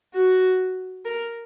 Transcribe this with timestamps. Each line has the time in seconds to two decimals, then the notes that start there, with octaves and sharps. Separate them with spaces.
0.14 F#4
1.05 A#4